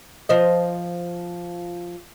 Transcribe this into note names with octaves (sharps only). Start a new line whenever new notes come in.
F3 C5 D#5